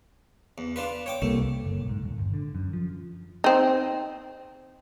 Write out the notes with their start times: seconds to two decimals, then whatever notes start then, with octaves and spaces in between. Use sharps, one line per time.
0.58 E2
0.76 D4 F4 B4
1.06 C#5 G5 D6
1.22 C2 A3 A#3
1.64 F#1
1.78 B1
1.89 G#2
2.04 D#1
2.18 G1
2.34 D3
2.55 F#2
2.73 F3
3.44 C4 D#4